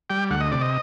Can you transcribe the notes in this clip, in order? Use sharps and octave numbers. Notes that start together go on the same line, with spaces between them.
G3 G5
D2 F#5
D#5
C3 D5
D#5